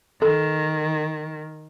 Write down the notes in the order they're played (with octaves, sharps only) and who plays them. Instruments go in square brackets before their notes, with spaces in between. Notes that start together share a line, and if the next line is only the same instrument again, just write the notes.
[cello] D#3 [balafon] A4